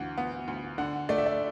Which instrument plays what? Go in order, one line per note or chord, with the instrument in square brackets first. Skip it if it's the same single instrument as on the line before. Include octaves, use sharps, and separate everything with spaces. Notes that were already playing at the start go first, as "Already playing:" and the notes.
Already playing: [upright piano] D2 E3 [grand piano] F#5
[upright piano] B3
D2
[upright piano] D3 [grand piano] F#5
[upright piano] A3 [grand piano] D5
[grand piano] E5
D5